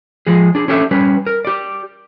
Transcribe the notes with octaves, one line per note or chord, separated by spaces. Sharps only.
F3 G#3 G#4
D4 G#4
C#4 D4 G4 A4 B4 E5
G3 C#4 B4
A#4
G4 D5